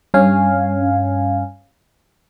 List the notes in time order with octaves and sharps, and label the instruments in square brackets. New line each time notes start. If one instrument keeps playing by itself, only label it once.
[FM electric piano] G2 C#4 F5 G#5